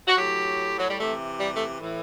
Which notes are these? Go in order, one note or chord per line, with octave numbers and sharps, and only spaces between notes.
F#4
A2 F#3 G4
F#3
G3
C3 E3 A3
G3
A3
A2 E3